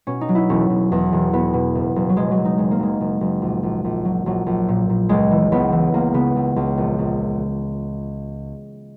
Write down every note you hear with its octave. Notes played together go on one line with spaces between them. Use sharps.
B2 C#4
D#4
F#3
E4
E1 C#4
E1
E2
E1
E1 B3
B2
F#1
F#1
F#3
F#1 G#3
F#3
F#1
D#4
F#1 G#3
A#3
F#1 G#3
F#1
F#1
A#1
A#1
A#1
F#3
A#1 F#3
A#1
A#2
A#2
C#2 G#3
E3
C#2 B3
E3
C#2 A#3
C#3 B3
C#2
C#2
A#1
A#1